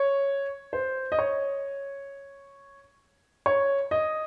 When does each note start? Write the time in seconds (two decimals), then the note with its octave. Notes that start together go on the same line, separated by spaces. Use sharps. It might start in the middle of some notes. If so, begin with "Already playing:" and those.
Already playing: C#5
0.73 C5
1.12 D#5
1.19 C#5
3.46 C#5
3.91 D#5